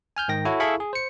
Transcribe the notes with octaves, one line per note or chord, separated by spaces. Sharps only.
G#5 F6 G6
G#2 D#3 G5 A#6
E4 F#4 A4 C#5
E4 G#4 A4 F5 B5 C#6
G#4
C5 C#7